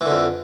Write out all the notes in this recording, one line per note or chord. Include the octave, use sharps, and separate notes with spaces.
F2 D3 E3